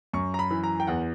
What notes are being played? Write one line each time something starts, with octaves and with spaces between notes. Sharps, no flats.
F#2 C#6
A#5
B5
E3
A#5
G5
E2 F#5